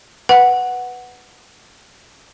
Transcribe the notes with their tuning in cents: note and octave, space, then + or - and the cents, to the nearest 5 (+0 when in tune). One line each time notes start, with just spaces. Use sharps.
B4 +0 F#5 +0